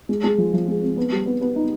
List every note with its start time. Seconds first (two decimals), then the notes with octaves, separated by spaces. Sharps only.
0.09 G#3
0.24 G#3
0.38 F3
0.53 F3
0.68 G#3
0.82 C4
0.97 B3
1.12 G3
1.26 B3
1.41 B3
1.56 D#4